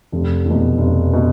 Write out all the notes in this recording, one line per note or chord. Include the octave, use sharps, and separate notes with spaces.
F1
E2
B2
F1
B2